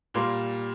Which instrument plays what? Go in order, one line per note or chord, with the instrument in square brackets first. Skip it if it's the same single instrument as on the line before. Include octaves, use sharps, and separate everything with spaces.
[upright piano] A#2 G3 A#3 C6